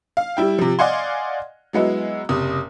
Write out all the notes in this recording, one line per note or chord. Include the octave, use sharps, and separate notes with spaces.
F5
G3 E4 G5
C3 F3
D5 D#5 F5 F#5 G#5 C6
F#3 G#3 B3 E4
F#1 C3 D#6